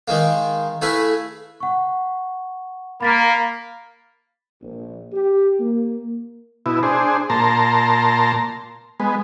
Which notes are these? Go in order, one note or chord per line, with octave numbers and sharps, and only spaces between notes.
D#3 G#3 A#3
A3 E4 G#4 B4 F5
F#5 C#6
A#3 B5 A6 B6
A#1
G4
A#3
B2 E4
D4 G#4 C5
A#2 A5 A#5 C6
G#3 B3